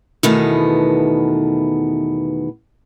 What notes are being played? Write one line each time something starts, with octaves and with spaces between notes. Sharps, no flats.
E2 B2 D#3 A3 B3